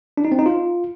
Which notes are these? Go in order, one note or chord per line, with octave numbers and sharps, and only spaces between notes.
D4
D#4
C4
D#4
F4